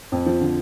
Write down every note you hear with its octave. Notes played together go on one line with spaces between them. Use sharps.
F2
F3
D3